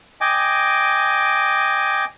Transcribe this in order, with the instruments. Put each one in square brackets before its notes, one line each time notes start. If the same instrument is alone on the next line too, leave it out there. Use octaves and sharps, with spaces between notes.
[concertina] D#5 G5 G#5 D6